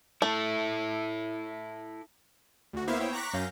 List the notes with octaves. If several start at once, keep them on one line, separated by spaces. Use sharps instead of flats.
A3 E4 A4
D2 F#4
A#3 B3 E4 C5 E5 F5
B3 E4 C5 C#5 G5
A#5 C#6 D6 F#6 A#6 B6
F#2 C#4 F5 G6 A#6